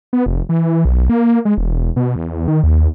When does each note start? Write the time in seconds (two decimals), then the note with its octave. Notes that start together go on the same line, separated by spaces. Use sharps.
0.13 B3
0.26 F1
0.49 E3
0.85 B1
1.09 A#3
1.45 G#3
1.57 E1
1.96 B2
2.16 E2
2.48 D#3
2.63 D#2